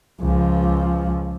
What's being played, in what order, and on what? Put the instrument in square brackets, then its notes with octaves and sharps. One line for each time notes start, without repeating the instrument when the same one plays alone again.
[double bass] C#2 F3